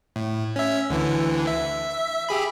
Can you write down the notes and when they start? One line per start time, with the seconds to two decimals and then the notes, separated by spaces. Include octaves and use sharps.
0.16 A2
0.56 C#4 E5
0.90 D2 D3 E3
1.47 E5
2.29 G4 G#4 B5